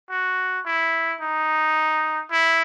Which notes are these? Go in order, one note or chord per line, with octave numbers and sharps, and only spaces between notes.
F#4
E4
D#4
E4